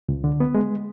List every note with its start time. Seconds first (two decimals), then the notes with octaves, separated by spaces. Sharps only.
0.09 C#2
0.24 D3
0.40 B3
0.55 G#3